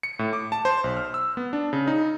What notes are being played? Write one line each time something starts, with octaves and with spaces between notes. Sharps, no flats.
C#7
A2
D6
A5
C5
B1
F6
E6
B3
D4
C#3
D#4